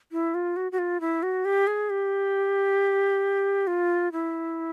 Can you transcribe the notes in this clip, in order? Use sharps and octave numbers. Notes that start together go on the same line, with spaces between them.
E4
F4
F#4
F#4
F4
E4
F#4
G4
G#4
G4
F4
E4